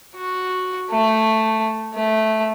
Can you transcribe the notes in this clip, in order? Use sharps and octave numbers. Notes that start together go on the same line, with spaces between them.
F#4
A3
A3